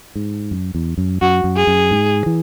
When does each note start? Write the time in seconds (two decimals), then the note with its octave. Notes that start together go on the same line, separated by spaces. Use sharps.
0.16 G#2
0.51 F#2
0.75 E2
0.98 F#2
1.22 F#2 F#4
1.44 F#2
1.57 G#4
1.67 F#2
1.91 G#2
2.26 E3